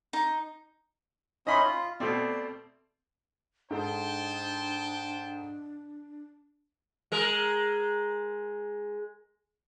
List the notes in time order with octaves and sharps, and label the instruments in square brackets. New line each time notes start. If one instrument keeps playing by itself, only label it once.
[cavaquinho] D#4
[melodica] C#4 D#4 E4 [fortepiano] D#5 B5 C6
[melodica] F4
[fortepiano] B2 A3 C4 [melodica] D5
[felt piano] G#2 A4 D#5 [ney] D4 [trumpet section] C5 G5 A5
[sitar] G#3 A#4